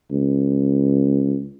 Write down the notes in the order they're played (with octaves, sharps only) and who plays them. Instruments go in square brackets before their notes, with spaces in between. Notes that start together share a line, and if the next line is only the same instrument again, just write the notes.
[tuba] C#2